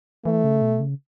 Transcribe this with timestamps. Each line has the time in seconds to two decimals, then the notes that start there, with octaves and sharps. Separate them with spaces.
0.25 E3 A3
0.44 C#3
0.62 B2
0.80 C#3